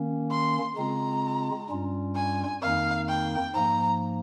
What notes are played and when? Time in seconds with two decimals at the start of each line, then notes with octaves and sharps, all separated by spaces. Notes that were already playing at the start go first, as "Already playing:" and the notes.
Already playing: D#3 A#3 C#4
0.31 C6
0.76 C#3 G#3 C4 F4 A#5
1.69 G2 G3 C#4 F4
2.16 G#5
2.61 F2 D#3 A#3 D#4 F5
3.09 G5
3.54 G#2 F3 A#3 A#5